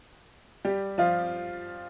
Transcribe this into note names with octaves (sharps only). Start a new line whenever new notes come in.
G3 G4
F3 F4